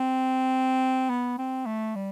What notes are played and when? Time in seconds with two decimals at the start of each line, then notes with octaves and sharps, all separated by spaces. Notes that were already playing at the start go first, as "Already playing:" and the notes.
Already playing: C4
1.10 B3
1.38 C4
1.66 A3
1.95 G3